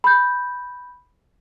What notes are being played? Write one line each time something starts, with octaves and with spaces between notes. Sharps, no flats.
B5 G6